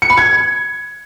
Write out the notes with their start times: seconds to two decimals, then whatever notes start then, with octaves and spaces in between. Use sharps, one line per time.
0.02 C#7
0.10 B5
0.18 G#6